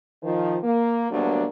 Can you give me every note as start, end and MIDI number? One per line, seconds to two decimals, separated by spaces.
0.23 0.56 51
0.23 0.56 53
0.63 1.05 58
1.11 1.45 38
1.11 1.45 54
1.11 1.45 55
1.11 1.45 58
1.11 1.45 59
1.11 1.45 62